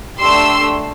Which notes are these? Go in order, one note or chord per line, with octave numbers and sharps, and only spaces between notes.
A3 D4 G4 C6 E6